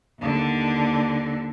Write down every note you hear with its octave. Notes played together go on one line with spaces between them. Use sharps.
D#2 D3